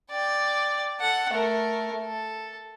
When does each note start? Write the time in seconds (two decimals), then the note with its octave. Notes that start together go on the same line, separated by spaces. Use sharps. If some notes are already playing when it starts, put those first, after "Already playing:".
0.11 D5 G5
1.00 A4 F#5
1.32 A3 A#4
2.05 A4